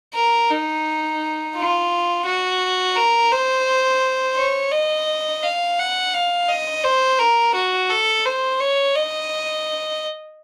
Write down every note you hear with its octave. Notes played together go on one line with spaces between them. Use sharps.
A#4
D#4
F4
F#4
A#4
C5
C#5
D#5
F5
F#5
F5
D#5
C5
A#4
F#4
A4
C5
C#5
D#5